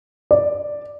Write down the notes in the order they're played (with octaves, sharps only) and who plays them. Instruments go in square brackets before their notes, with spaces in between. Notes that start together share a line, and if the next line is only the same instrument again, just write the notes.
[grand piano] D5